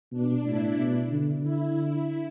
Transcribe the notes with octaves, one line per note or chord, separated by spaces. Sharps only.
B2 D4
A2 E4
B2
D3
D3 E4